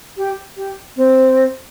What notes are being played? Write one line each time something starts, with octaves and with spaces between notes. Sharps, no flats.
G4
G4
C4